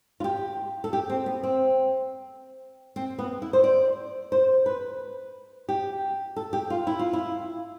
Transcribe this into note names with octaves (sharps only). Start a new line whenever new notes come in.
F4
G4
A4
G4
C4
B3
C4
C4
B3
E4
C5
D5
C5
B4
G4
A4
G4
F4
E4
F4
E4